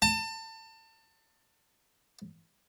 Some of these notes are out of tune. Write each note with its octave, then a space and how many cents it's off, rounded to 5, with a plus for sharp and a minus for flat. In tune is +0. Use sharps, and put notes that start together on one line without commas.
A5 +30